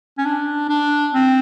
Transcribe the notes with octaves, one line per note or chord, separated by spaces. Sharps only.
C#4
D4
D4
C4